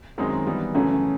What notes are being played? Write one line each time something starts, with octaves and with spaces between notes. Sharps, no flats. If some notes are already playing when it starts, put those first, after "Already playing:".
F#2 D#3 G#3 C4 D#4
E3 G3 B3 D#4
F#2 C#3 E3 A3 C#4